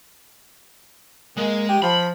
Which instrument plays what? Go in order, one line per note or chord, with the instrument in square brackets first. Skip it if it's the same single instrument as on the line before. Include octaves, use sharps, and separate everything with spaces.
[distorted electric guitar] G#3 [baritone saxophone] A#3
[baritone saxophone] G4
[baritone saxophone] F3 [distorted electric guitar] B5